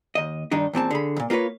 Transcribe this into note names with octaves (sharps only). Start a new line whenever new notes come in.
D#2 D#5
G2 D#3 D4 D#4
E2 A#2 C4 A5
D3 G#4 B5
D#2 A#2
A#3 F4 A4 B4 C#5